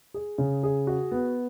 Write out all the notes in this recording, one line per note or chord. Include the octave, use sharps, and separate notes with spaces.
G#4
C#3
G#4
F#4
B3